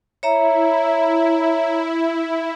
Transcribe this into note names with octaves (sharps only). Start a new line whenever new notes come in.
E4 C#5 E5 A#5